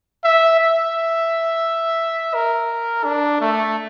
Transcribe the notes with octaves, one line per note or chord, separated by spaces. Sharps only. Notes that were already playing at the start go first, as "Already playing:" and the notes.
E5
E5
A#4
D4
A3